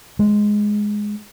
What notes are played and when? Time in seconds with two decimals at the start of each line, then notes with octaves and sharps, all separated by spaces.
0.19 G#3